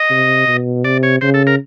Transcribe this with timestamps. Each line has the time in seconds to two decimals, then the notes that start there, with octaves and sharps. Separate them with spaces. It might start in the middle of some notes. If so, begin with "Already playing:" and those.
Already playing: D#5
0.10 C3
0.47 B2
0.84 C3 D5
1.03 C#5
1.21 C#3 C5
1.34 A4
1.47 A#4